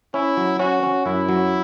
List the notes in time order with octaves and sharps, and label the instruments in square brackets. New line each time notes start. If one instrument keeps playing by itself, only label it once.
[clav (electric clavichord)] C#4 [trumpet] E4
[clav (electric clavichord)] F#3
[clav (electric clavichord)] C#4 [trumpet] F#4
[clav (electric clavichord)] C#4
[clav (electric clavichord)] F#2 [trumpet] E4
[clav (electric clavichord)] F#3